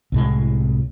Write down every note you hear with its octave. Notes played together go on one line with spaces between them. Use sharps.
C2 A2 G#3